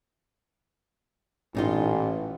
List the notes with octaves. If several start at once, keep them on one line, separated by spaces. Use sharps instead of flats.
A1 A#2 D#4 F4